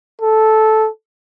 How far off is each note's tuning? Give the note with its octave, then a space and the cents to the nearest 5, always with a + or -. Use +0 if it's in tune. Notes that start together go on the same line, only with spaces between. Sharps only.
A4 -10